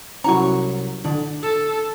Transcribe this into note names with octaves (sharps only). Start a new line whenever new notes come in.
C2 F#3 C#4 E4 F#4 C#5 A#5 C#6
D3 D4 D5
A4 A5